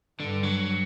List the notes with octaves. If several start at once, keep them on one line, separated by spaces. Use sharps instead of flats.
G2 D3
F#3